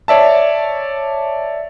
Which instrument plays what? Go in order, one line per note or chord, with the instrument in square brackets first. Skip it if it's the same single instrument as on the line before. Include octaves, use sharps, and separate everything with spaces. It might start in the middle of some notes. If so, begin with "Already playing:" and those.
[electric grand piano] C#5 D5 E5 A5